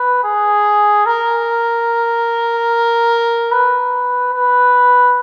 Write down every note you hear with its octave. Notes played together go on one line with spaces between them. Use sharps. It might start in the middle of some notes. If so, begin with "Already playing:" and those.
Already playing: B4
G#4
A#4
B4
B4